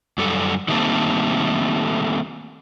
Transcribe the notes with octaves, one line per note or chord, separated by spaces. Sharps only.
F#2 G3 A4
D#3 G3 A3 A#3 C4 A4